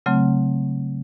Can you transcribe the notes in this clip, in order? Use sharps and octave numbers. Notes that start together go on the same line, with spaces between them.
C#3 F#3 A3 C4